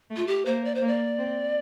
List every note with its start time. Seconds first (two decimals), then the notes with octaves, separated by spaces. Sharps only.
0.10 A3
0.16 F4
0.27 G4
0.45 A#3 C5
0.65 D5
0.75 C5
0.82 A#3
0.87 D5
1.18 C4